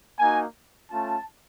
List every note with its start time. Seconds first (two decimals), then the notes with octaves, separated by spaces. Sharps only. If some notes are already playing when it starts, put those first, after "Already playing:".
0.19 A#3 D#4 F#4 G#5
0.91 A3 C#4 F4 A5